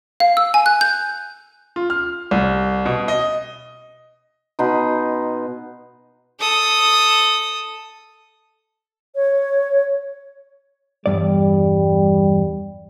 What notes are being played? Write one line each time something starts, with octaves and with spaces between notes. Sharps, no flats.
F5
E6
G#5
F#6
G6
F4
F6
C2
B2
D#5
B2 D#4 B5 C6
A4 D#6
C#5
E2 G2 G3 D5